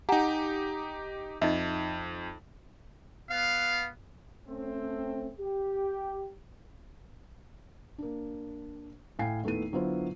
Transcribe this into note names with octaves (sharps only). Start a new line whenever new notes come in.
D#4 G4 F#5 G#5 A#5
F2 D#4 D#5 E5
B3 F5
A3 C4 C#4
G4
A#3 D4
A2 F5 G5 G#5 C7
D#2 A3 B3 E4 D#7
D3 F#3 B3 E4 F4 C5